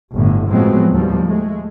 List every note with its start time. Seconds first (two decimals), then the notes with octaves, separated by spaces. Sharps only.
0.14 G1 A2 D3
0.49 A2 F3 F#3 G#3 B3 C4
0.92 D#2 F3 G3
1.25 G#3 A3